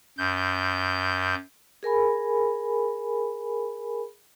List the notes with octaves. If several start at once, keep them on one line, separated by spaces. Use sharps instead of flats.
F#2 G6
G#4 A#4 G#5 B5